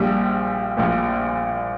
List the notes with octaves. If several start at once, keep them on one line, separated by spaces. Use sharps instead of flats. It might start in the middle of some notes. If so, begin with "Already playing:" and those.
Already playing: A#1 A#2 G3
A#1 A#2